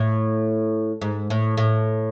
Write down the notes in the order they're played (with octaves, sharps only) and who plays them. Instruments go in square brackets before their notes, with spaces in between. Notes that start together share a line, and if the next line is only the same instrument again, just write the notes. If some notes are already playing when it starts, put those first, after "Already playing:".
Already playing: [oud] A2
G#2
A2
A2